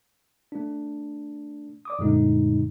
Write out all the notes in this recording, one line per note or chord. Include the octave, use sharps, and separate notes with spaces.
A3 D4
D5 D6 D#6
F#2 A#2 D3 G#3 A3 D#4